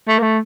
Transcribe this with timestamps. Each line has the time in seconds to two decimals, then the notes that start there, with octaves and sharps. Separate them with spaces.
0.08 A3
0.19 A#3
0.23 A3